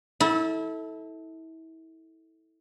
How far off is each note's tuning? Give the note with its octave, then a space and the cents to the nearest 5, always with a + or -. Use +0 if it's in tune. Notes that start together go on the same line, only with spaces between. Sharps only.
E4 -30 A4 +0